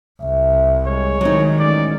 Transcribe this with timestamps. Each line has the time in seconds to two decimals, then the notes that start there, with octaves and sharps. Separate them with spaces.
0.21 C2 E5
0.87 G3 G#3 C#5
1.21 C2 D#3 F#3 G#3 D#4
1.59 A1 G#2 D5